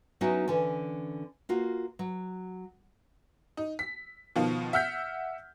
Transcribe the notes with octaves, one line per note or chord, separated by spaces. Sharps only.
F#3 B3 C#4 D#4 E4 F#4
D3 E3 C#4
A#3 F4 F#4
F#3
D#4
B6
B2 D#3 F3 F4
E5 F#5 F6 G6 B6